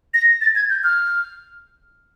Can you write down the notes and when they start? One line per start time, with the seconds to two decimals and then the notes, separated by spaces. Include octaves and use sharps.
0.14 A#6
0.41 A6
0.56 G#6
0.70 G6
0.84 F6